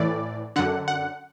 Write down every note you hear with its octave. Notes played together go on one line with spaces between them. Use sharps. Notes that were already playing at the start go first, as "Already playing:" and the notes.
Already playing: A2 E3 D5
F#2 D3 F#5
F#5